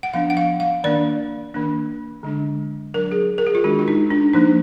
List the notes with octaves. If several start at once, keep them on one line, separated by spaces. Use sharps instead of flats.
F#5
F3 B3 D4 F5
F#5
F5
F5
D#3 A#3 D4 D5
D#3 A#3 D4
D3 G#3 D4
F#3 D4 A#4
G#4
A#4
G#4
F4
D#3 G#3 D4 F#4
F4
D#4
D4
F3 A#3 D4 D#4